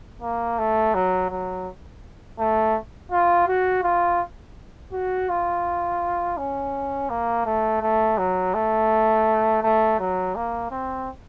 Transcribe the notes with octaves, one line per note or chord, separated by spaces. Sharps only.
A#3
A3
F#3
F#3
A3
F4
F#4
F4
F#4
F4
C#4
A#3
A3
A3
F#3
A3
A3
F#3
A#3
C4